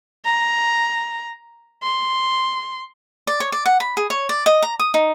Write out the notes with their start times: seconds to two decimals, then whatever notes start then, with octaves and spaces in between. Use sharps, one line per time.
0.25 A#5
1.83 C6
3.27 D5
3.40 C#5
3.52 D5
3.66 F#5
3.80 B5
3.97 G#4
4.10 C#5
4.29 D5
4.46 D#5
4.62 A#5
4.80 D#6
4.94 D#4